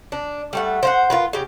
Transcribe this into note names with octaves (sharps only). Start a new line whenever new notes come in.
D4
G3 A3 F#5
C5 F5 F#5
F4 A#4 B4
C#3 G4